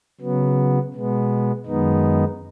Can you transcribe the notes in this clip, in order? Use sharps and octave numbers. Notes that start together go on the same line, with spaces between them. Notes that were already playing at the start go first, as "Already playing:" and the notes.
C#3 F#3 B3
B2 G#3 B3
F#2 D#3 G#3 B3 D#4